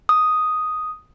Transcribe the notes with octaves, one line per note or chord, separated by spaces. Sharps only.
D#6